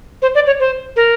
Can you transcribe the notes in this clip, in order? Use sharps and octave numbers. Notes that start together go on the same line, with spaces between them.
C5
D5
C#5
C5
A#4